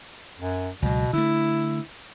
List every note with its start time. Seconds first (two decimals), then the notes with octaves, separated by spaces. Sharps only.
0.40 F#2
0.82 C#2 B2 F#3
1.13 D3 A3 E4